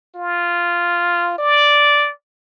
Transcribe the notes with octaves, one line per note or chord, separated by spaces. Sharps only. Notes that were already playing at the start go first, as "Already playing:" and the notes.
F4
D5